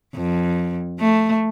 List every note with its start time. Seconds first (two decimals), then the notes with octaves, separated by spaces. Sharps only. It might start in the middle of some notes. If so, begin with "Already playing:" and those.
0.15 F2
1.00 A3